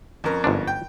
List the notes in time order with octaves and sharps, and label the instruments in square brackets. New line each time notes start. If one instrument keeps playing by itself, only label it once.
[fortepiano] F2 C#4 A#4
[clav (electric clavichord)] G1 G#2 D4
[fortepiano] G5